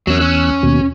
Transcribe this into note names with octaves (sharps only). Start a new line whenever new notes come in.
E2 F#3 C#4 E6 F#6
C#4
D#2 B2